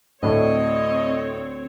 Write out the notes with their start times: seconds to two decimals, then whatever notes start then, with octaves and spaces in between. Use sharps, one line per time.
0.23 D2 A2 C4 D4 C#5 D#5 E5